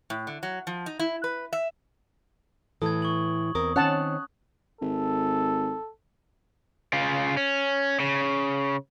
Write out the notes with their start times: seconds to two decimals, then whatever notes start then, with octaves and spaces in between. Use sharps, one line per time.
0.10 A2
0.27 D3
0.43 F#3
0.67 F3
0.86 D#4
0.99 E4
1.24 B4
1.53 E5
2.82 A2 E3 A4 D#6 G#6
3.02 C#6 F#7
3.55 E2 C4 A#4 D#6
3.76 D#3 C4 C#4 C#5 F#5 A5 F#6
4.81 G#1 A4
6.93 C#3 F4
7.37 C#4
8.00 C#3